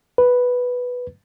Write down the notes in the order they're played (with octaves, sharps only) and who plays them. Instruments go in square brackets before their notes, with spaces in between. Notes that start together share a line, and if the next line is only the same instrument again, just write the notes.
[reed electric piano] B4